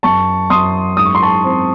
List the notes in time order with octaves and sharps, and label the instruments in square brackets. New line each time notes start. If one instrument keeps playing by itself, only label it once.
[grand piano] F#2 A5 C#6
F#2 C6 D#6
G#2 D#6
C#6
C6
A5 C#6
C4